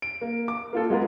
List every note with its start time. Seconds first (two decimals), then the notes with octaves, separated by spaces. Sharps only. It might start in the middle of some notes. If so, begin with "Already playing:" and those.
0.02 D7
0.21 A#3
0.48 D6
0.73 A#3 F4 A4
0.90 G#3 B3 F4 A#4